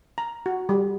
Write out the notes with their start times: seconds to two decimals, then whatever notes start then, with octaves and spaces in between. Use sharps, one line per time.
0.18 A#5
0.46 F#4
0.69 G3